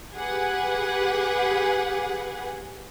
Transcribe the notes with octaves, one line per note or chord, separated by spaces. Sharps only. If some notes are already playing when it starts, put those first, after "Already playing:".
G4 G#4 B4 F#5